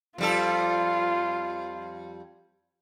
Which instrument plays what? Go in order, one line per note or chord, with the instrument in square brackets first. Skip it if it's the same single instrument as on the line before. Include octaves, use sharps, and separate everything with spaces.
[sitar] F2 G3 A4 [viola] F4